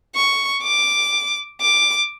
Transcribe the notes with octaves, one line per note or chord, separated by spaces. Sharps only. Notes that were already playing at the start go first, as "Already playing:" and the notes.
C#6
D6
D6